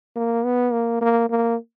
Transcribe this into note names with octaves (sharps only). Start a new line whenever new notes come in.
A#3
B3
A#3
A#3
A#3